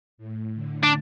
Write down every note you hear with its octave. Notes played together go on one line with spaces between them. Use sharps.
A2
D3
D4